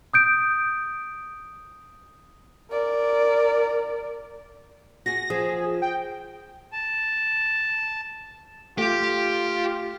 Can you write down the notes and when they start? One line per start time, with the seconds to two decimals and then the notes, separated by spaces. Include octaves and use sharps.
0.14 D#6 G6 D7
2.70 A#4 D5
5.06 F#4 G#4 A#6
5.30 F3 G#4
5.82 G5
6.72 A5
8.78 A3 F4 G4